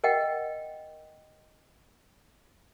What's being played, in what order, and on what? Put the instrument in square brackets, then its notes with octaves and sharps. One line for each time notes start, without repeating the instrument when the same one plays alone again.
[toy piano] A#4 D#5 F#5 G5